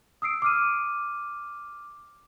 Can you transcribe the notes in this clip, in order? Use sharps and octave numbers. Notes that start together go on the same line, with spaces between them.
D#6 E6 C7 D7
D6 F6 D#7